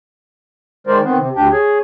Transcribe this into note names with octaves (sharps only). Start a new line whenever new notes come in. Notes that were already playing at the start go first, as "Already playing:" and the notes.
D#3 G#3 A#4 C5 D5
D#3 B3 C4
C3
D2 D4 G4 G5
G#4 C#5